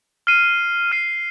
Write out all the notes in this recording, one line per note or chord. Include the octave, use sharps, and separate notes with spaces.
F6 C7 D#7
F6 C7 D#7